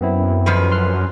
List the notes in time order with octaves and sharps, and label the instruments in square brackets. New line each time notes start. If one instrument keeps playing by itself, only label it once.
[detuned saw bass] F#2 [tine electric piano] B3 C4 E4
[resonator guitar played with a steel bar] F2 F3 B4
[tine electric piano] C6 F6 F#6